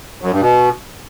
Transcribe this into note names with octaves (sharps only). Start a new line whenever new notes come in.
F#2
G2
B2